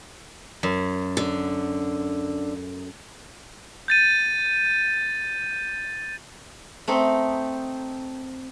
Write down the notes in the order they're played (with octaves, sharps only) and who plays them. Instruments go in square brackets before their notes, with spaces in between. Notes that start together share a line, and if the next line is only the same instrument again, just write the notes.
[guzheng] F#2
[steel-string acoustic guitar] D3
[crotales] G6 A6 D#7
[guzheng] A3 C4 D#4